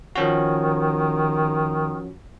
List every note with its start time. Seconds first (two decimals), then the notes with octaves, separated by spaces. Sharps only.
0.16 D#3 F3 C#4 F#4